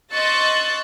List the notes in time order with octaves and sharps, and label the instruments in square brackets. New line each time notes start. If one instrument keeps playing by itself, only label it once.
[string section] D#5 C6 C#6 E6 F#6 A6